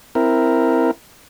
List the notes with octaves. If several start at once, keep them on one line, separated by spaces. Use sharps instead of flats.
C4 E4 A#4